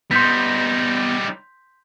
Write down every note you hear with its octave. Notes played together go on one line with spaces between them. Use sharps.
G3 B3 D#4 C6 G6 B6